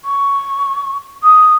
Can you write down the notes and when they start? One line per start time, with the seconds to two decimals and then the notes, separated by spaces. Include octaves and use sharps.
0.04 C#6
1.23 D#6